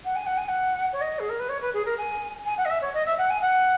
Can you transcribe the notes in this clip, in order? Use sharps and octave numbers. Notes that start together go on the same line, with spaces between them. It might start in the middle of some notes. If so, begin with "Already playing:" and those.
F#5
G#5
F#5
G#5
F#5
C#5
D#5
G#4
A#4
B4
C#5
B4
G#4
A#4
G#5
G#5
F#5
D#5
E5
C#5
D#5
E5
F#5
G#5
F#5